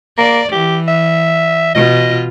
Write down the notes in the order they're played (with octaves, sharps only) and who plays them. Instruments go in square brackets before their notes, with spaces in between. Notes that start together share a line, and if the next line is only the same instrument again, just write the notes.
[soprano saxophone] A#3 [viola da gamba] D5
[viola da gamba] E3 [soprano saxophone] G4
[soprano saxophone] E5
[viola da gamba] B2 F4 [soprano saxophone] D#5